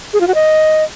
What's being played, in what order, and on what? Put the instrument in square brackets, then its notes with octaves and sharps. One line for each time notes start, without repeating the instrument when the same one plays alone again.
[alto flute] G#4
F4
F#4
D#5